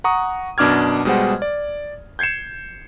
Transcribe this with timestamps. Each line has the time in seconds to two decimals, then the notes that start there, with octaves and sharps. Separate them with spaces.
0.04 F#5 A#5 C#6 D#6
0.58 F#2 B2 D4 D6 F6 G#6
1.05 B2 G3 G#3 C5 F#5
1.42 D5
2.19 G6 G#6 C7 C#7 E7